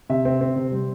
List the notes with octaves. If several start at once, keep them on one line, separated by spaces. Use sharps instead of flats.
C3 E5
C4
C4
C3
G3